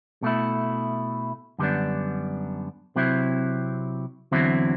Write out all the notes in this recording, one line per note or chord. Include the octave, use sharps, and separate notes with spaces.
B2 A3 E4
F#2 D3 G3 B3 D4
C3 F#3 C4 E4
E2 D3 F#3 C4 E4